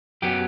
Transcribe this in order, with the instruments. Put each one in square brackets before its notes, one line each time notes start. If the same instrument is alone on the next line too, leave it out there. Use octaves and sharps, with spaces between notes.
[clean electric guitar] F#2 F#3 B3 G4